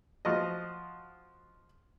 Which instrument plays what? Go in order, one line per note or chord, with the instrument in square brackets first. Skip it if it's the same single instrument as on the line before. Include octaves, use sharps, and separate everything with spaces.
[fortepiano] F3 F#4 D#5